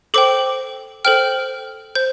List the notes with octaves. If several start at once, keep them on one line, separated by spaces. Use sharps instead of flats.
A4 C5 G5 D6
A4 C5 G5 F6
C5 G6